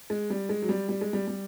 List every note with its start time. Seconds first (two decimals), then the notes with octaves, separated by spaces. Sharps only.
0.10 G#3
0.30 G3
0.49 G#3
0.62 F#3
0.69 G3
0.89 G3
1.01 G#3
1.13 G3
1.28 G3